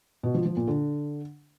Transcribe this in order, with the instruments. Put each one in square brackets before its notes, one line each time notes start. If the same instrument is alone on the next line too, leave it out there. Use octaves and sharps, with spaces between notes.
[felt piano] B2
F3
F3
A#2
D3